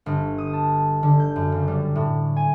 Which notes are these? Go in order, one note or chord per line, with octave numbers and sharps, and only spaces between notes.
G1
D#6
A5
D3
G6
F#2
F#1
G3
A2
G#5